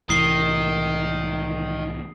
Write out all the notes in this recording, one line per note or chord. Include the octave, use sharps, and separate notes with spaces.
C2 A2 D#3 E3 D#6 C7 G7